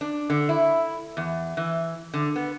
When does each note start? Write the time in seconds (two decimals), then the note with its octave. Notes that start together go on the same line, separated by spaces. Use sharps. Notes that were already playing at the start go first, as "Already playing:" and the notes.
0.01 D4
0.30 D3
0.49 E4
1.17 E2
1.57 E3
2.14 D3
2.36 B3